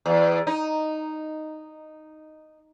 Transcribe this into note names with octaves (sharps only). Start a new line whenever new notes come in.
E2
D#4